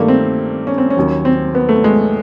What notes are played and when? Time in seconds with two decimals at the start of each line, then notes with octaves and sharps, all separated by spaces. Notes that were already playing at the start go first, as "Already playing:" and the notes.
Already playing: G2 D#3 G3 A3 A#3
0.08 C4
0.67 C#4
0.78 C4
0.90 C#4
0.97 D#2 D#3 F#3
1.25 C4
1.55 B3
1.69 A3
1.84 G#3